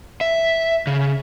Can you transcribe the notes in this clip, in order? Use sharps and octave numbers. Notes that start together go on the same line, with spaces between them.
E5
C#3